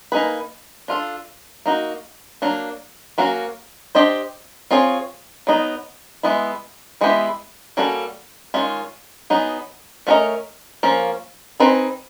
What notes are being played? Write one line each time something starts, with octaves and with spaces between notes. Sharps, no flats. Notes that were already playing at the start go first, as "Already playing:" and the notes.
A#3 D#4 G#4 B4
D4 F4 A4
A#3 D#4 F#4
F#3 A#3 D4
F#3 A#3 C#4 F#4
D4 G4 C5 D#5
C4 F4 G#4 C#5
F#3 B3 D#4
G#3 B3 E4
E3 G#3 B3 E4 G4
G3 A#3 C#4 F#4 A4
D#3 G#3 C#4 F4
F#3 B3 D#4 G#4
A3 C#4 F#4 A#4 D#5
F3 A#3 C#4
C4 D#4 G#4 B4